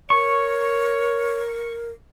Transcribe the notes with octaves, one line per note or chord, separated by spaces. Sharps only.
A#4 C#5 C#6